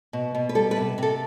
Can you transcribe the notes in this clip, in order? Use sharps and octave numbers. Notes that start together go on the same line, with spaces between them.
B2
B2
B4
G3 A4
B4
C3
C3 A4